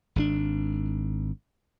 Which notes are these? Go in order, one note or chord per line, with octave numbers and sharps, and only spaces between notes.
G#1 D#3 D4